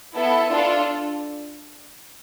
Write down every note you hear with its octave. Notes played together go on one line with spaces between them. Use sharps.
B3 E4 A4
D4 F4 A4